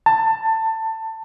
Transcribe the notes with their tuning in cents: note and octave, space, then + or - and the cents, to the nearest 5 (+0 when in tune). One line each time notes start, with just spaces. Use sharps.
A5 +20